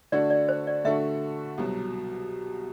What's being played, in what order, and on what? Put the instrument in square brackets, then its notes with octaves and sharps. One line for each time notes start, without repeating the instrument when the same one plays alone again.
[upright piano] D3 A3 D4 F#4 [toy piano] D5
[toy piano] D5
C5
D5
[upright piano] D3 A3 D4 F#4 [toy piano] E5
[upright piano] C2 B2 F#3